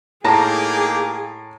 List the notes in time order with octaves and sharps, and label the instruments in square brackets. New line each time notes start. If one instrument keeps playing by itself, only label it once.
[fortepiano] A2 [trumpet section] A#3 D#4 G4 [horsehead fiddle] G#4 [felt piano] A5 A#5 A#6